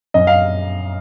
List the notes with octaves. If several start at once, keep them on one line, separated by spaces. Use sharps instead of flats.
F#2 D#5
F5